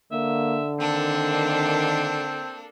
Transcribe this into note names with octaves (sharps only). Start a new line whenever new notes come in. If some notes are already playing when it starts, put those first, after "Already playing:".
D3 A#3 E5
D#3 A#3 C4 D4 A4